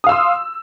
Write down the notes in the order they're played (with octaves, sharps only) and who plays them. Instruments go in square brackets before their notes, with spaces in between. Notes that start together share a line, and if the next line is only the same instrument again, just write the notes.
[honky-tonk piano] D#6
F5
E6
C6